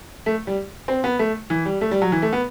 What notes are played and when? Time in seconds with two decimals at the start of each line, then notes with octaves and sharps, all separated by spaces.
0.26 A3
0.47 G3
0.88 C4
1.04 B3
1.19 A3
1.50 E3
1.65 G3
1.81 A3
1.91 G3
2.02 F#3
2.12 E3
2.22 A3
2.33 B3